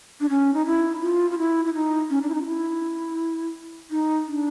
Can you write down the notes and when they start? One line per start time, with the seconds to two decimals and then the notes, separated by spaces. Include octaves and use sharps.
0.21 D4
0.30 C#4
0.54 D#4
0.66 E4
1.02 F4
1.31 F4
1.38 E4
1.65 E4
1.74 D#4
2.10 C#4
2.22 D4
2.29 E4
2.34 D#4
2.42 F4
2.46 E4
3.91 D#4
4.27 D4